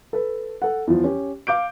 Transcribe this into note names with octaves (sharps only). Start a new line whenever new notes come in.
A4 B4
A4 F#5
E2 F3
C#4 G4
F5 D6 G6 D7